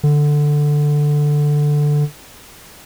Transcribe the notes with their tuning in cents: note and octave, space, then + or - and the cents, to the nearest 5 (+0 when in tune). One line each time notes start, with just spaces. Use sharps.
D3 +5